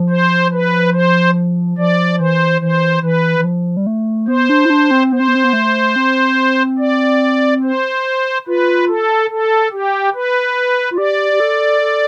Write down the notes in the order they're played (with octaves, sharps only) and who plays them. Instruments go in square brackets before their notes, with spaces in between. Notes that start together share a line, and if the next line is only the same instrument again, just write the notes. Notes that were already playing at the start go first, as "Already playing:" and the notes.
Already playing: [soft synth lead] F3
[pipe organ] C5
B4
C5
[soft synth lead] F3 [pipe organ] D5
[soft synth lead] E3 [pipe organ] C5
[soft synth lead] E3 [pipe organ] C5
[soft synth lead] E3 [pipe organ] B4
[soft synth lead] E3
F3
G3
A3
[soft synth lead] B3 [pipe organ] C5
[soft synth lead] D4
E4
D4
C4
[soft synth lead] B3 [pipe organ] C5
[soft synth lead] C4
B3
C4
B3
A3
C4
[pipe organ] D5
C5
[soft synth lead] F4 [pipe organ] B4
[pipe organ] A4
A4
G4
B4
[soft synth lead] F4
[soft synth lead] G4 [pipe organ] D5
[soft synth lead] G4
A4
A4